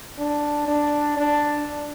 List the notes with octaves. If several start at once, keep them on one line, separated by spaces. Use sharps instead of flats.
D4
D4
D4